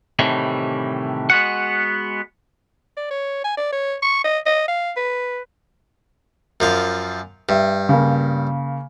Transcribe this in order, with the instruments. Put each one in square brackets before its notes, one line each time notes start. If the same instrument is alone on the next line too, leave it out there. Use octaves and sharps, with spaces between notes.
[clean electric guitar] A2 C3 D#3 E3 G3 A3
G#3 B3 F#4 F#5
[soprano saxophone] D5
C#5
G#5
D5
C#5
C#6
D#5
D#5
F5
B4
[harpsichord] F#2 F3 F5
[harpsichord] G2 [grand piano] E5
[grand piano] C#3 A#3